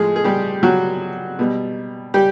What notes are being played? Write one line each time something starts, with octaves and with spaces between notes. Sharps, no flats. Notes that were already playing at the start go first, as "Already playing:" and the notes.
Already playing: A2 F3 G#3 G#4
G#4
G3 G4
F#3 F#4
B2 G3
G3 G4